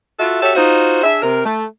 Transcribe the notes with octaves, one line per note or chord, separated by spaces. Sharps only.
F4 F#4 A4 E5
F#4 G4 A4 C#5 E5
D#4 F4 F#4 C5
D4 G#4 E5
C3 A#4
A3